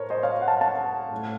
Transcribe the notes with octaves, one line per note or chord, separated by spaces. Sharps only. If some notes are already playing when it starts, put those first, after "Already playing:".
Already playing: A2 A3 A#4 C5 C#5
C5 D#5
C#5 F5
F#5
F5 A5
F5 A5
A2 A3